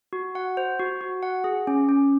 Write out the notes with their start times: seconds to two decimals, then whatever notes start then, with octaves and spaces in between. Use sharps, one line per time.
0.13 F#4
0.35 F#5
0.57 C5
0.79 F#4
1.01 F#4
1.23 F#5
1.44 G#4
1.67 C#4
1.89 C#4